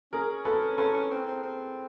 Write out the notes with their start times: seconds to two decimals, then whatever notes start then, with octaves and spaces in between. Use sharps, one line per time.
0.12 C#4 G#4 A#4
0.45 A4 B4
0.78 C#4 A4 B4
0.94 C#4
1.11 C4
1.27 C4
1.43 C4